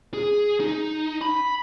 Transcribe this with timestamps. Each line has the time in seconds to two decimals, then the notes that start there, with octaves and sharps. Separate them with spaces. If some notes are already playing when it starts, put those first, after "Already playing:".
0.14 G#4
0.60 D#4
1.22 B5